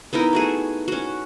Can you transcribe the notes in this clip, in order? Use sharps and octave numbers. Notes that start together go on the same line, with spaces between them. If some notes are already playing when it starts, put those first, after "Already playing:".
B3 D#4 E4 A#4
A3 F#4 G#4
C#4 F#4